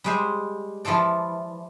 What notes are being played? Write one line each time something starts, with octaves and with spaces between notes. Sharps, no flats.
G3 G#3 C5
E3 F3 F4 A4 D5